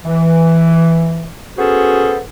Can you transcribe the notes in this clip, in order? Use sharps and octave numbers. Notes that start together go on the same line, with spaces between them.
E3
B3 C#4 F#4 G#4 A4 C5